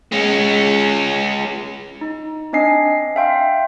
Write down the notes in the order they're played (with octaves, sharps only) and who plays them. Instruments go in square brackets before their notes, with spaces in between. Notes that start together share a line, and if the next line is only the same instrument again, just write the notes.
[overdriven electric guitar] G#3 C#4
[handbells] D#4
C4 D4 D#5 G#5 C7
E5 F5 G5 C6